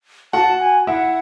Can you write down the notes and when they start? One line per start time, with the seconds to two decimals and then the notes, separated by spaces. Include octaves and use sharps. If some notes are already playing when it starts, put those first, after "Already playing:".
0.33 F#4 F#5 A5
0.60 G#5
0.87 E4 E5 F#5